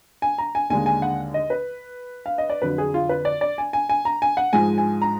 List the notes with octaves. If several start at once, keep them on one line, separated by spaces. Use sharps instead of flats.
G#5
A#5
G#5
D#2 D3 G#3 G#5
G#5
F#5
D#5
B4
F5
D#5
D5
F2 D3 F#3 B4
G#4
F4
B4
D5
D5
G#5
G#5
G#5
A#5
G#5
F#5
G#2 F3 G#3 G#5
G#5
A#5